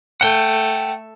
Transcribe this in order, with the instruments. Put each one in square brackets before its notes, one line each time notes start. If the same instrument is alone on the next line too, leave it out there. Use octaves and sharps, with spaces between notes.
[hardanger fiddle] A3 [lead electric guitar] F#5 G5